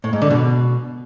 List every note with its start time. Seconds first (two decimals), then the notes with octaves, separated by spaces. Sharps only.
0.04 A2
0.13 G#2
0.22 D3
0.30 B2